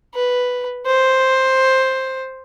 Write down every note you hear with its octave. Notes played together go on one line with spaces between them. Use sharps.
B4
C5